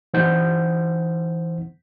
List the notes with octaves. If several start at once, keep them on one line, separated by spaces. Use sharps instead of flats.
E3 D#4 C5 F#5 G6